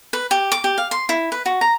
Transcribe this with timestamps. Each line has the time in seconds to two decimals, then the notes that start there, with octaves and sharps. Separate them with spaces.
0.13 B4
0.31 G4
0.52 D6
0.64 G4
0.78 F5
0.91 C6
1.09 E4
1.32 B4
1.46 F#4
1.61 A#5